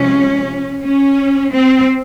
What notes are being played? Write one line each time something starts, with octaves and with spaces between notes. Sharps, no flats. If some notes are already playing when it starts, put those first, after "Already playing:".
Already playing: C3 F3 G#3 C#4
C#4
C4